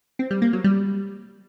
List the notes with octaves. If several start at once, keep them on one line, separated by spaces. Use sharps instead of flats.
C4
G3
A#3
F#3
G3